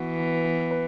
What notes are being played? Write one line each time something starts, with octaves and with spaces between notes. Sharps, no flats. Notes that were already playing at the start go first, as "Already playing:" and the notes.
Already playing: E3 B3 F#4 B4
B3
B3
B4